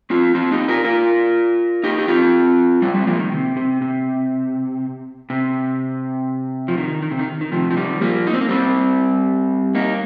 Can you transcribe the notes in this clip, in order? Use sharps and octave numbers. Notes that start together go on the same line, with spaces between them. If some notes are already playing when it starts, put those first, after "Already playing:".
C4 F4
C4 F4
D#4 G4
F4 A#4
F4 A#4
D#4 G4
G4
C4 F4
G3 C4
G3 C4
F3 A#3
D#3
C3
C3
C3
C3
F3
D#3
D#3
C3
D#3
D#3
C3 F3
F3
D#3 G3
F3 A#3
D#4
C4
A#3
G3 C4
A#3 D#4